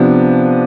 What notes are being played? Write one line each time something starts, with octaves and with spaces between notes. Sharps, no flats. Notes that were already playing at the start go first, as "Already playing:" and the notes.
Already playing: C3 F3 B3 D4